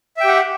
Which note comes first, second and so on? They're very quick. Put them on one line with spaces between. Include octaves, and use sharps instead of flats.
E5 G5 G4 F#5